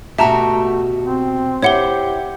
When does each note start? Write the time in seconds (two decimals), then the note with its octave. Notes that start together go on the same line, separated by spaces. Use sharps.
0.18 B2 A3 F#4 G4 E5 A5 A#5
1.03 C4
1.63 E4 G4 C5 C#5 F#5 G7